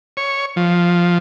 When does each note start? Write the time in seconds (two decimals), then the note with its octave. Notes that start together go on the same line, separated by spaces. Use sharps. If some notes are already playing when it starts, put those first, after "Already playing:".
0.17 C#5
0.56 F3